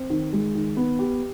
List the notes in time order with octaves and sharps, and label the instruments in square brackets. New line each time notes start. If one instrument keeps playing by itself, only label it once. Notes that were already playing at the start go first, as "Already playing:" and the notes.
Already playing: [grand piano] C4
D#3
G#3
D#3
B3
G4